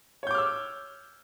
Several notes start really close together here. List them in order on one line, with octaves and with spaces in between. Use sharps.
C#5 G6 D6 F6 E6